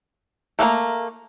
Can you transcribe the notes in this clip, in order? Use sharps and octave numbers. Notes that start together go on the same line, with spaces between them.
A3 A#3 C5 A#5